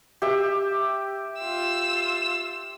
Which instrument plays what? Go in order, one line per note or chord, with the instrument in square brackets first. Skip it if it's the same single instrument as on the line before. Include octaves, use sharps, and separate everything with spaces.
[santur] G4 E5
[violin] F4 E6